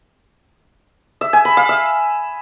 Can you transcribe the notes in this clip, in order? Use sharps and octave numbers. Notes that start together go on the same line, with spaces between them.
E5
G#5
B5
F5
E5